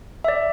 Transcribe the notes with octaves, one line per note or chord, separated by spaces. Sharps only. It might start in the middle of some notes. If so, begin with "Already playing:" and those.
E5
D5